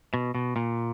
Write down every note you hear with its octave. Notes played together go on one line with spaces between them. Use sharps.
B2
B2
A#2